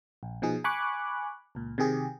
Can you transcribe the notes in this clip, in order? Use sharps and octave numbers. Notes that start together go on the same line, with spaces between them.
A#1
B2 F3 D#4 G#4
G#5 B5 C#6 D6 F#6
C#2 A#2
C3 D#3 G4 G#4